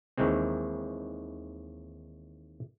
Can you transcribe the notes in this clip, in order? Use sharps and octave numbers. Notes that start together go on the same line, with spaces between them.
D#2 D#3 E3 G#3 C4